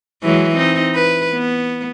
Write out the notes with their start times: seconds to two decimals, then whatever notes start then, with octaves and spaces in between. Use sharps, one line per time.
0.23 E3 F#3 G#3
0.56 C4 D#4
0.95 B4
1.32 B3